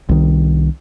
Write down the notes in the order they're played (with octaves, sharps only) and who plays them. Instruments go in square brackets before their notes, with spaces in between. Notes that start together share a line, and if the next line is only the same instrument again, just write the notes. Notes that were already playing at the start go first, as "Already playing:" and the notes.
[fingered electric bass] C2 D#3